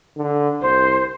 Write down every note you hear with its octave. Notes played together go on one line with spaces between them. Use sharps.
D3
C2 C5